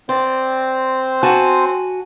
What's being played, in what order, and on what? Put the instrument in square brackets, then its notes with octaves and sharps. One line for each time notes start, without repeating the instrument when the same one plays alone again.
[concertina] C4 C5 [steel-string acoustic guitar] D5
[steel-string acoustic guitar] F#4 G#5 A5